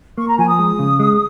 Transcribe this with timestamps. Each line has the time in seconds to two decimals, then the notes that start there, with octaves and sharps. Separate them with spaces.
0.18 A#3 C#6
0.28 A#5
0.38 F3 G#5
0.48 D#6
0.59 G#3
0.79 C#3
0.99 G#3